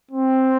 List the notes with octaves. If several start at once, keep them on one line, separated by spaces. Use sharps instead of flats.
C4